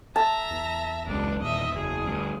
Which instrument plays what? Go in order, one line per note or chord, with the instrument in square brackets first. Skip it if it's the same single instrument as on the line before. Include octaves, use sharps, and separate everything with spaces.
[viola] E5 A#5 [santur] A5
[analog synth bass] E2
[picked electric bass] F#1 C#2 [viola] D4
[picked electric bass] D#1 [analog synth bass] E2 [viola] D#5 E5
[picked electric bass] F#1 [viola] G#4
[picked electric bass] D2 G2